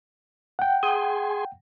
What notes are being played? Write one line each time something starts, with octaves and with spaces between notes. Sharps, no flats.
F#5 G5
G#4 G#5 C6